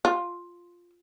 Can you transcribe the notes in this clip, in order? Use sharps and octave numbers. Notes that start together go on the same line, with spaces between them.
F4